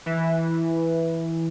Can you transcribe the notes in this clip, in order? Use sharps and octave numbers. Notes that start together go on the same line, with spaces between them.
E3